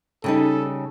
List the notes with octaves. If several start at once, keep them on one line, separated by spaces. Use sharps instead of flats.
C#3 G3 D#4 A4